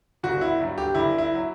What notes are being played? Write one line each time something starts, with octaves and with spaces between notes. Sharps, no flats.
G1 F#4
E4
G2 F#3
G4
G1 E4
E4
F#3